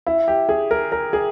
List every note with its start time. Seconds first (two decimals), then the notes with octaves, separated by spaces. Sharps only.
0.07 E4
0.28 G4
0.49 G#4
0.71 A#4
0.92 A#4
1.13 G#4